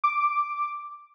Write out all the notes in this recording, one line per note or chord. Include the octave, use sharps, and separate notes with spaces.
D6